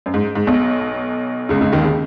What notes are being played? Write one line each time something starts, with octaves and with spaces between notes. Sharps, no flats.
F#2
G#2
G#2
B1 B2
C#2 C#3
C#2 C#3
D#2 D#3
C#3